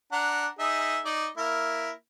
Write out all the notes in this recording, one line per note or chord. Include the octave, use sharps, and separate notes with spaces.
D4 F#5 A#5
D#4 G#4 E5
D#4 D5
A#3 E4 A#4